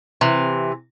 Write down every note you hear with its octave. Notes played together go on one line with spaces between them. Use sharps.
C3 E3